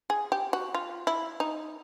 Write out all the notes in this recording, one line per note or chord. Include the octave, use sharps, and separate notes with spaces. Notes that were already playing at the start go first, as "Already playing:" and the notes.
G#4
G4
F#4
F4
E4
D#4